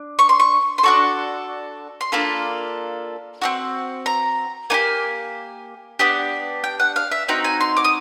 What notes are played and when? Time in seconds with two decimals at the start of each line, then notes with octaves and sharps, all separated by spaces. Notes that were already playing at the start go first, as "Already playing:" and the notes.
Already playing: D4
0.19 C#6
0.29 C6
0.40 C#6
0.78 C6
0.83 D4 F#4 A4 C#6
2.01 C6
2.12 A#3 D4 F4 A4 B5
3.42 C4 D#4 F#4
4.06 A#5
4.70 A#3 D#4 G4 G#5
5.99 B3 D4 G4
6.64 G5
6.80 F#5
6.96 F5
7.11 E5
7.28 C4 D#4 F#4 G5
7.44 G#5
7.61 C6
7.77 D6
7.84 D#6